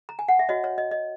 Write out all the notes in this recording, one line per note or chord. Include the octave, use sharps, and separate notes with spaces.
A#5
G#5
F#5
E5
F#4 C#5 D#5
C#5
D#5
D#5